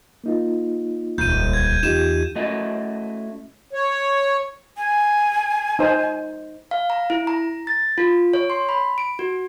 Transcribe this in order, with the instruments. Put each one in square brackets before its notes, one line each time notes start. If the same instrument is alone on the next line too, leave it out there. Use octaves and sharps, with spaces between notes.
[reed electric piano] A#3 D#4 F4
[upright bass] D#1 C#2 [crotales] G6 D#7
[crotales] G#6
[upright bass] E2 [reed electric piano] D#4 F4 G4 [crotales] E7
[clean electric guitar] A3 C#4 E4 F#4 D#5
[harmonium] C#5
[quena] G#5
[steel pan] D#4 C5
[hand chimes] F5
A#5
E4
A#5
A6
F4
C#5
C6
B5
D7
F#4